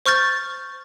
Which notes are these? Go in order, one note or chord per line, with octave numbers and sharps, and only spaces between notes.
C5 C#6 F6 G6 A6